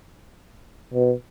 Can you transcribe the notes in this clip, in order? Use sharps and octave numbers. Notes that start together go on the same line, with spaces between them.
B2